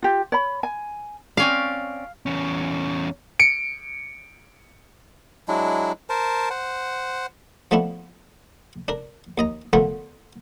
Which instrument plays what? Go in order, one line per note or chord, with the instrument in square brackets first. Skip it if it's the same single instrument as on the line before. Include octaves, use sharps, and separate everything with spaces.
[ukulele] F4 G4
C#5 B5
G#5
[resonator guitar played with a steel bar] C4 C#4 D5 [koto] F5
[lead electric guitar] E2 C#4
[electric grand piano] C#7 D7
[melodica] F#3 G#3 D4 E4
A#4 C5 A5
C5 F#5
[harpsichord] F3 A3 B3 D4 E4
D4 A#4
D#2 D#5 A#5
D3 A3 B3 F4 A#4